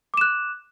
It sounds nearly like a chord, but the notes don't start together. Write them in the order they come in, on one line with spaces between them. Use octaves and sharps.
D6 E7 F#6